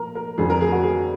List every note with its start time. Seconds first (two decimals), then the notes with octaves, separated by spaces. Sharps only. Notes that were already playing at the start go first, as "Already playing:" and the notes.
Already playing: A#2 F3 A#4
0.15 A#4
0.38 F2 D3 F3 G#4
0.50 A#4
0.61 G#4
0.72 F#4
0.83 G#4